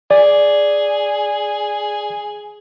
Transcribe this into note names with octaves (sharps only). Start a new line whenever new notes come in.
G#4 D5